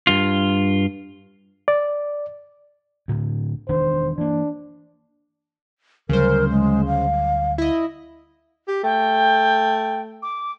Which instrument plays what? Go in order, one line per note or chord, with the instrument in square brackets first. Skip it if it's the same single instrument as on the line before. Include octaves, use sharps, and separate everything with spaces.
[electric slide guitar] G2 F4
[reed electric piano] D5
[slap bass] D2 A2 D3
[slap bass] E1 D#3 D4 [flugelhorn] C5
[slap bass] E3 A#3 [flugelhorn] D4
[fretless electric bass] D2 F#3 G3 [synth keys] C#3 C5 [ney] A#4
[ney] G#3
F5
[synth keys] E4 D#5
[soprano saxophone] G4
[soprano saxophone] A3 [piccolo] G5
[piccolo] D6